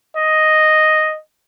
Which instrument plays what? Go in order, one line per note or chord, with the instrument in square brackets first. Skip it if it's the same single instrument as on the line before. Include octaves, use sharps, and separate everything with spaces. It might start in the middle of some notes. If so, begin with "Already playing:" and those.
[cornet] D#5